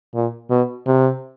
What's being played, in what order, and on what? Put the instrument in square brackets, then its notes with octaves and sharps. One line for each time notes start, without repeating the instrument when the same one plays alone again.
[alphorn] A#2
B2
C3